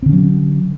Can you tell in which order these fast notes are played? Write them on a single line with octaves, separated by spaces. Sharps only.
C4 D3 C#4 F#3